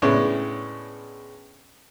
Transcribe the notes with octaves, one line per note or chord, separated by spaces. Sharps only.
A2 C#3 G#3 B3 C#4 D4